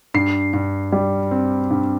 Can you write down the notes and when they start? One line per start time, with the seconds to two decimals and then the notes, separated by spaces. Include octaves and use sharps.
0.14 G2 C7
0.53 G2
0.92 G3
1.31 C4
1.70 G2